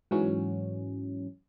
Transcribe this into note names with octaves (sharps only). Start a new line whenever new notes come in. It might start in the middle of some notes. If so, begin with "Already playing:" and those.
G#2 E3 F#3 C#4